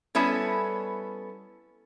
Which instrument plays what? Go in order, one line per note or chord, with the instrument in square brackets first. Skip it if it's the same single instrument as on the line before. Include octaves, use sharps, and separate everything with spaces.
[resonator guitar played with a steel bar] G3 B3 C#4 E4 A4